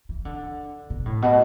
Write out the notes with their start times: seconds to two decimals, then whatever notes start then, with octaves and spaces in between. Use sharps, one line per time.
0.09 E3
0.25 D3
0.90 B2
1.06 A2
1.22 B2